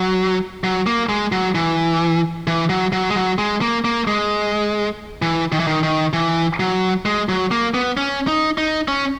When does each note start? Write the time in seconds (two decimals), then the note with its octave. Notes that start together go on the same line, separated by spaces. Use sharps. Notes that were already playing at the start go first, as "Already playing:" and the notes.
Already playing: F#3
0.64 F#3
0.87 A#3
1.09 G#3
1.32 F#3
1.55 E3
2.47 E3
2.69 F#3
2.92 F#3
3.10 G#3
3.15 F#3
3.38 G#3
3.61 A#3
3.85 A#3
4.07 G#3
5.22 E3
5.52 D#3
5.60 E3
5.67 D#3
5.83 D#3
6.13 E3
6.60 F#3
7.06 G#3
7.29 F#3
7.51 A#3
7.74 B3
7.97 C#4
8.28 D#4
8.58 D#4
8.88 C#4